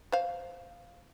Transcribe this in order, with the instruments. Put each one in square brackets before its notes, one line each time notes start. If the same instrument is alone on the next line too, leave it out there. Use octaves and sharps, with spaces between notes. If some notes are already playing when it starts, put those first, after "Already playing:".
[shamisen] C5 F5